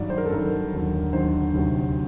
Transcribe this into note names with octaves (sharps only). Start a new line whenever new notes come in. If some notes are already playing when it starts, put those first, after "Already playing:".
Already playing: G2 D#3 F#3 D5
C5
A#4
A4
G2 D#3 F#3 A#4
D#2 D3 F#3
D#2 D3 F#3 C5
D2 C3 D#3 F#3